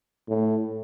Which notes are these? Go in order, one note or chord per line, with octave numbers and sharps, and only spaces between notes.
A2